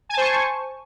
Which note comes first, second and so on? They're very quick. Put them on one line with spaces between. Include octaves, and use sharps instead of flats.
G#5 A5 C5 C#6